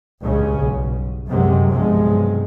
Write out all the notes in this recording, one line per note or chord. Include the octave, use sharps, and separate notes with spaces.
C#2 G2 C#3 C#4
B1
F#2 C3 F#3 G#3
B1 G2 C3 F3 G#3